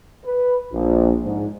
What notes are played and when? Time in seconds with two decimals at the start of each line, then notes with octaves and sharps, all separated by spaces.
0.25 B4
0.73 A#1
1.24 G#2